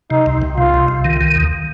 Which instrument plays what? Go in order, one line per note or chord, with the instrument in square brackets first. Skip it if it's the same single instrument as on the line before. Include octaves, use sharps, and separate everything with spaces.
[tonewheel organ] C3 [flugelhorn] D#4
[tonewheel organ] C2
C2
[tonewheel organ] C3 [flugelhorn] F4
[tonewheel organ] C3
C2
D#3
D#3
D#2